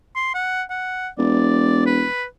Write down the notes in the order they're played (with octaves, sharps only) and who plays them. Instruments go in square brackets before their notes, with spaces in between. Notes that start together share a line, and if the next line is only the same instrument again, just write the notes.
[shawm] C6
F#5
F#5
[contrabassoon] E1 [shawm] D5
[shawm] B4